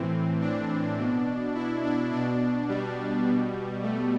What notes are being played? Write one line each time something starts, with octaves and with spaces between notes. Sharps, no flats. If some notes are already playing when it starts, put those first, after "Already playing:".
Already playing: A2 E3 C4
D4
B2
E4
D4
B2 D4
G3
B2
A3